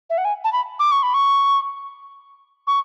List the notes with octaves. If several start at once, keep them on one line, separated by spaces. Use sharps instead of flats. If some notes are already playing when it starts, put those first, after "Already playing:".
E5
F#5
G#5
A5
B5
D6
C#6
B5
C#6
C#6